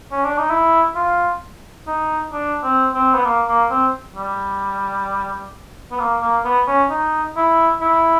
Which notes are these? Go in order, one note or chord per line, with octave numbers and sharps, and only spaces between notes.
C#4
D4
D#4
E4
F4
D#4
D4
C4
C4
B3
A#3
A#3
C4
G3
B3
A#3
A#3
B3
C#4
D#4
E4
E4